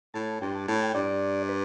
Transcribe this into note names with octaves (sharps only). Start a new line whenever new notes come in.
A2 A5
G2 G5
A5
A2 A5
G5
G2 D5
B4